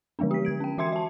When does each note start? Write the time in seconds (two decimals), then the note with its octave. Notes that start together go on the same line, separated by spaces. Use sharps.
0.19 D3 F3 G#3 B3 D4
0.31 G4 B6
0.45 D3 G#6 D7
0.60 C#4 G5
0.78 E3 F#4 E5 C6 G#6 C#7
0.93 E5 A5